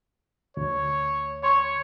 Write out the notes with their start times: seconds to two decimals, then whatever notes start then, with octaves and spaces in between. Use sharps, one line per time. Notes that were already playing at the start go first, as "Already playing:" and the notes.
0.57 D2 C#5
1.43 C#5 C6 C#6